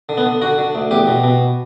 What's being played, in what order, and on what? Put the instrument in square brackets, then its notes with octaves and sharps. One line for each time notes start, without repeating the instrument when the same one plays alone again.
[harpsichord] D3
B3
D3
D3 F#4
D3
D2
E2 G4
B2
B2